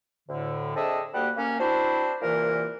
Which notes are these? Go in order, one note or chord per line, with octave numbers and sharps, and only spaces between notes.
D2 A2 D3
C4 D4 G#4 A4 D#5 E5
D2 G3 A#3 G4 F#5
A#3 C#4
C4 D4 E4 F#4 C5
C2 A#2 E3 A#3 A#4